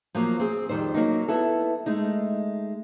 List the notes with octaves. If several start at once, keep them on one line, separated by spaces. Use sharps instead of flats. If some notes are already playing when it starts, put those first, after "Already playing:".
F3 F#3 A#3
C4 G#4
F2 D#3 G3 C5
F#3 A#3 D#4
B3 E4 A4
G#3 A3 D#4